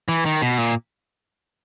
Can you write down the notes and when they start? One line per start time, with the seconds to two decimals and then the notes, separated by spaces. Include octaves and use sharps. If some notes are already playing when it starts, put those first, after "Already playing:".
0.09 E3
0.25 D#3
0.42 B2
0.58 A#2